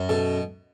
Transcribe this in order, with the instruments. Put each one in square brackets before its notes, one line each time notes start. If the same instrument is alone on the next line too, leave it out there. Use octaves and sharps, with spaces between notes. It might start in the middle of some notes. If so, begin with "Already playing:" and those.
Already playing: [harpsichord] F#2
[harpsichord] B2 [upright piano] A4